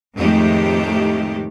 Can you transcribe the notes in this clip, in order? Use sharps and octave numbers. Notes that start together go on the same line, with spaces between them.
F2 A2 D#3 G#3 A3 G4